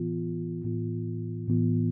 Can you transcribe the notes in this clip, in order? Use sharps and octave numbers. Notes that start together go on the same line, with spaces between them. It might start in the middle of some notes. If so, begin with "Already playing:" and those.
Already playing: A2 E3 B3 F4
A2 E3 B3 F4
A2 E3 B3 F4